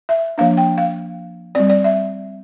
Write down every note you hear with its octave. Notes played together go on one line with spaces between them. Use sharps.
E5
F3 A#3 D4 F5
G5
F5
G3 C4 D5
D5
E5